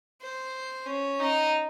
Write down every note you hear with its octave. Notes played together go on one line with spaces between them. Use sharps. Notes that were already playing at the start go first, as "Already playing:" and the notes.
C5
C#4
D#4